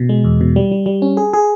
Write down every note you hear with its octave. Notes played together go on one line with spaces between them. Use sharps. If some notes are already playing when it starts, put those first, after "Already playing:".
Already playing: B2
G#3
E2
B2
G3
G3
G3
C#4
G#4
G#4